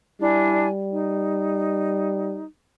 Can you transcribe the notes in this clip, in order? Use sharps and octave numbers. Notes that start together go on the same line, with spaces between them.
G3 D4 E4 G#5
D#4